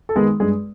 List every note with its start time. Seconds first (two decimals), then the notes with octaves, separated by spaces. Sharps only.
0.09 A4
0.16 D#3 G#3 B3 G#4
0.40 G2 G#3 G#4